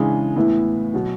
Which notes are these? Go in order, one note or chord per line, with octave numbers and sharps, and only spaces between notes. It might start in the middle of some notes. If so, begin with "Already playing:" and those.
Already playing: C#3 E3 G#3 D4 G#4
A2 E3 B3 E4
B2 F#3